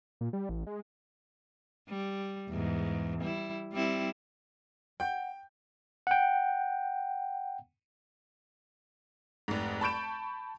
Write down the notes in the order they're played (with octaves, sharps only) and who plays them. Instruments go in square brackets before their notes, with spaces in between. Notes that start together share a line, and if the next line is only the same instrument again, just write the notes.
[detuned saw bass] A#2
G3
A1
G#3
[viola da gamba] G3
E2 G#2
G3 E4
G3 C4 E4
[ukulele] F#5 [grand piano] G5 G6
[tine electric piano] F#5 G5
[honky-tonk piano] F1 G#2
A5 B5 C#6 G6 D7 E7